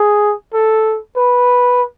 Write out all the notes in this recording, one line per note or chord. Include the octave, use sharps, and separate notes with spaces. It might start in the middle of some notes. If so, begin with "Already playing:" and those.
Already playing: G#4
A4
B4